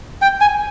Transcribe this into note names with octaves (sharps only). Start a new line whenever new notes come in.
G5
G#5